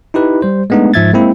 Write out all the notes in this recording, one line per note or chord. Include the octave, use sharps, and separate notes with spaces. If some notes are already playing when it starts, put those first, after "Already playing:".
D#4 E4 G4 B4
G3 C5
G#3 A3 B3 D4 D#4
G#2 F3 E5 G#6 A6
G#3 A#3 C4 E4